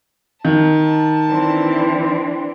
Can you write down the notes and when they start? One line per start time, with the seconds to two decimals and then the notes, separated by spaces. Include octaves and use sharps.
0.45 D#3 A5
1.28 E3 C4 D4